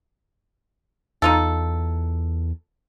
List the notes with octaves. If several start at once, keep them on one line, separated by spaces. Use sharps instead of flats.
E2 D#4 F4 A4